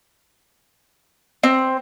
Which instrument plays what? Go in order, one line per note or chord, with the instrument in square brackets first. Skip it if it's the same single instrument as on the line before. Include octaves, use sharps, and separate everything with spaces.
[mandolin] C4